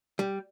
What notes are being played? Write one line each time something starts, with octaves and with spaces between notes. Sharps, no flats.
G3